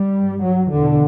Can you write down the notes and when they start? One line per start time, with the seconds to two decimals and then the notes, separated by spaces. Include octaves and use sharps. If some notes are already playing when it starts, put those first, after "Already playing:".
Already playing: G3
0.15 G2
0.42 F#3
0.71 E2 B2 D3